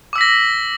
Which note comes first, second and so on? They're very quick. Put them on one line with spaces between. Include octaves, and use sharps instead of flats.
D6 E6 B6 A#6